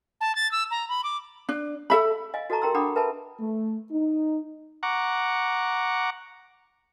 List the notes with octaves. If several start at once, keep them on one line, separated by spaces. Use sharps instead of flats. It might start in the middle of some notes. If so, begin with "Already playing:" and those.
A5
A6
E6
A#5
B5
D6
D4
A4 E5 B5
D#5 F5 G#5
F#4 A4 D#5 A5 A#5 C#6
G4 A#4 G5 A#5 C6 E6
D4 F#5 G5 B5 D6 D#6
A#4 B4 E5 G#5 A5 B5
A3
D#4
F#5 A#5 C#6 D6